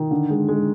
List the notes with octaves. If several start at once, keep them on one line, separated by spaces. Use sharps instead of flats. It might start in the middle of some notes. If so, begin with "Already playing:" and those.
Already playing: D#3
D3
G#3
G#3